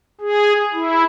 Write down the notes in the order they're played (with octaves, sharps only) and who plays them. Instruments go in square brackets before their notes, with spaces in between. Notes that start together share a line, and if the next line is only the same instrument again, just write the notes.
[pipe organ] G#4
E4